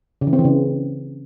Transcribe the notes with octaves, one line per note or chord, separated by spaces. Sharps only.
C#3
E3
C4
E3
C#3